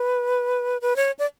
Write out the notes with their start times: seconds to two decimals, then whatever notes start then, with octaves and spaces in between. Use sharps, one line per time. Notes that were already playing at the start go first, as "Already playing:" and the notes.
Already playing: B4
0.81 B4
0.96 C#5
1.19 D5